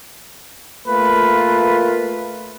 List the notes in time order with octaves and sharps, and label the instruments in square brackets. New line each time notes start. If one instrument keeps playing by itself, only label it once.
[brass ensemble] A3 A#3 F4 [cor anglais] B4